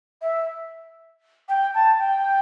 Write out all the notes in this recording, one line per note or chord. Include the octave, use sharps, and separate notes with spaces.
E5
G5
A5
G5